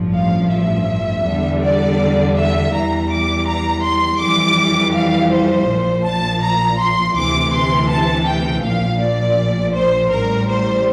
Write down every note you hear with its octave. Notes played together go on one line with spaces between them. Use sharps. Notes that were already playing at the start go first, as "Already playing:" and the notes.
Already playing: A1 G2 F3
F5
E5
E2 D3 G3
D5
E5
E2 E3 G3 A#5
D6
A#5
C6
F2 E3 G3 D6
F5
C5
A#1 A#2 F3
A5
A#5
C6
D2 C3 E3 D6
C6
A5
G5
A#1 A#2 F3 F5
D5
C5
A1 A2 G3 A#4
C5